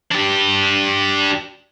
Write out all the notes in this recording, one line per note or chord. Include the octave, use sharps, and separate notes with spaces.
D4 G4